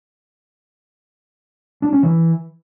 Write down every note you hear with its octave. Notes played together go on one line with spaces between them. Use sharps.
D4
C#4
E3